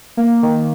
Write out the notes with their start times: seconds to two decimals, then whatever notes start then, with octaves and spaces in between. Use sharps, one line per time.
0.17 A#3
0.43 D#3